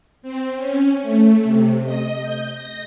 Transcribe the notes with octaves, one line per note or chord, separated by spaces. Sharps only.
C4
C#4
A3
C3
D#5
G6
A#6